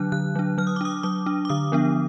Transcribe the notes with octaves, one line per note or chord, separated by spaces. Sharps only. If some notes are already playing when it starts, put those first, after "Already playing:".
Already playing: D3 F#3 D4 F#6
D3 F#6
F#3 D4
F#3 F6
D#6
D6
D4 D#6
F#3 D6
D4
D6
D3 D#6
F3 B3 D4